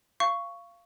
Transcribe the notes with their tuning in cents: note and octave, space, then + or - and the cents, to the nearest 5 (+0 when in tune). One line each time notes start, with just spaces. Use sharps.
F5 -20 C#6 +5